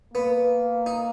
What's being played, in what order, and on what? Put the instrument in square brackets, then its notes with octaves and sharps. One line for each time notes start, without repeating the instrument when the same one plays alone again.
[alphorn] A#3 [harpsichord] B3
[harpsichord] D#4